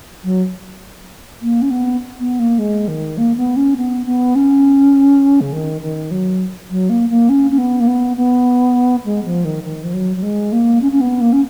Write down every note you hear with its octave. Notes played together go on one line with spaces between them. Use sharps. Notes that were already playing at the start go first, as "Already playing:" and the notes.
F#3
A#3
C#4
B3
B3
A#3
G#3
D#3
A#3
B3
C#4
B3
B3
C#4
C#3
D#3
D#3
F#3
F#3
A#3
A#3
C#4
C#4
B3
A#3
B3
B3
G#3
F3
D#3
D#3
F3
F#3
F#3
G#3
A#3
C#4
C#4
B3
A#3
C#4